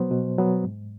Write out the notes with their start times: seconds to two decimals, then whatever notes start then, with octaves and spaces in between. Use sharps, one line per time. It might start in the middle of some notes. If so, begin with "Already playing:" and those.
Already playing: B2 F#3 B3 C5
0.11 B2
0.38 F#3 B3
0.64 G#2